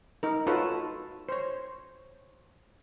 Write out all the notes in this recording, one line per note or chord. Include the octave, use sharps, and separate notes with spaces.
D#4 A#4
D#4 F4 F#4 A4 B4 C#5
C5 C#5